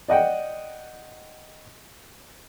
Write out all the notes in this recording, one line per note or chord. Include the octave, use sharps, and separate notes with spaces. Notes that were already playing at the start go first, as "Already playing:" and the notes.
D5 D#5 F#5 G5